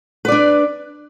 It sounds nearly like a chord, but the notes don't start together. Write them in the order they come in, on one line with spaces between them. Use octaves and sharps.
B4 D5 D4